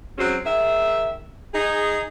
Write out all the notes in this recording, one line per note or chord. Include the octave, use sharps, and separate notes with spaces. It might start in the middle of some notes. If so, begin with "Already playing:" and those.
F#3 G#3 C4 C#4 F#4
D#3 G#4 E5
D#4 G#4